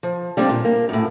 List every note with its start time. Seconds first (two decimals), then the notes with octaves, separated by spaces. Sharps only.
0.03 F3
0.37 G3 A#3 C4 D4
0.49 A#2
0.65 A#3
0.89 F#2 A2